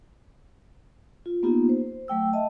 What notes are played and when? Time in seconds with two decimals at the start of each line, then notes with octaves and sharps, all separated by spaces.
1.26 F4
1.43 A#3 B3 D#4 F4 G4
1.69 C5
2.08 F#3 A3 G5 E6
2.33 D#5 E5 A5